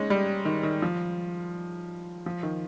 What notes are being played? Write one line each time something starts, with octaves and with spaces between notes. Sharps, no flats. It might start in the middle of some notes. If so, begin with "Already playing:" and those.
Already playing: G#3 C#4 D#4
G3
D#3
D#3
F3
F3
D#3